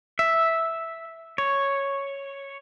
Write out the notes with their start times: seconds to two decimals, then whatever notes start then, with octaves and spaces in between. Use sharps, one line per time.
0.19 E5
1.38 C#5